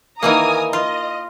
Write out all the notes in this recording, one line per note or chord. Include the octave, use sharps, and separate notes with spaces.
D#3 E3 A#3 G#5 A#5 D#6
F4 D#5